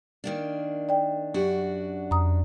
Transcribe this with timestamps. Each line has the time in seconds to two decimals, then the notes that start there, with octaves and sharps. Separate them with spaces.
0.24 D#3 A#3 D4
0.89 D5 G5
1.34 F#2 D4 F#4 G4
2.11 F2 A#5 D#6